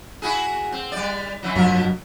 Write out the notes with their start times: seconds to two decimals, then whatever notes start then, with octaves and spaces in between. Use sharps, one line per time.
0.22 E4 F#4 G#4
0.72 C4
0.92 G3 D5
1.43 F#2 E3 F#3
1.55 F1 G2 B2 F3 F#3 A#4